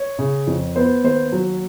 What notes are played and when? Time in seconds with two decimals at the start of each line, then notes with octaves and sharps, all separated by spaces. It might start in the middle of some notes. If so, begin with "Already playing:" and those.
Already playing: C#5
0.19 C#3
0.47 F2
0.76 B3 C5
1.04 D#2 C5
1.32 F#3